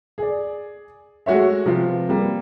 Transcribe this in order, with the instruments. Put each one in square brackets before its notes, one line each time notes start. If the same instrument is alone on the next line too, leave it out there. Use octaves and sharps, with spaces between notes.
[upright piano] G#4 D5
G#3 A3 F#4 C#5 E5
C3 F3 B3 F4
G3 A#3